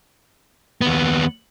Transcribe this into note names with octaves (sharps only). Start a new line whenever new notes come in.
D#2 B3